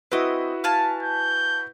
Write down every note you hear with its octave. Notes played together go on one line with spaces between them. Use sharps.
C4 E4 F#4 B4 D#5
F5 G#5 A5
G6